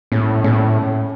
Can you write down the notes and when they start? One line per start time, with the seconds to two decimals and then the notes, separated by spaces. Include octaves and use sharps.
0.12 A2 C#4
0.44 A2 C#4